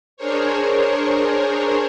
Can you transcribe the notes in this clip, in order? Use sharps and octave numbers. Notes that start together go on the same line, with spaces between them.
D4 G#4 A#4 C5 C#5